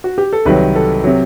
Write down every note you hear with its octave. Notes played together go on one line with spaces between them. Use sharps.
F#4
G4
A4
C2 C3 D#3 F#3 B4
A4
C3 F#3